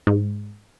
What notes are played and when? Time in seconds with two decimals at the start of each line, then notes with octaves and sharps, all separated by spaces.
0.07 G#2